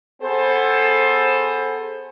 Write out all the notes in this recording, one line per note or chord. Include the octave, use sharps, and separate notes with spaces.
B3 G#4 A4 C5